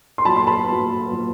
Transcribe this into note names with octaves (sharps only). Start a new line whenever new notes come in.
C6
A#2 F#3 A5 B5
C6
A5 B5
A#2 F#3
A#2 F#3